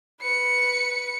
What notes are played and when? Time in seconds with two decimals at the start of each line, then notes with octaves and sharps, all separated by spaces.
0.21 B4 C#7